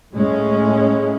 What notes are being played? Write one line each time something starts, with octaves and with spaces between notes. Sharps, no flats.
A2 G#3 C#4